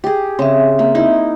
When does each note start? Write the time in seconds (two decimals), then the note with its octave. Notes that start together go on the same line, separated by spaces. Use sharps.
0.04 G4 G#4
0.39 C#3 C4 E5
0.79 A#3
0.95 D#4 E4